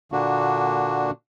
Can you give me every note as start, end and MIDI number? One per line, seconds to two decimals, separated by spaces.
0.12 1.11 46
0.12 1.11 50
0.12 1.11 58
0.12 1.11 62
0.12 1.11 66